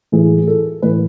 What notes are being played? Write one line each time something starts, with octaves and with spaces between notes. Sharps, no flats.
A2 E3 G#4
A4
A2 E3 B4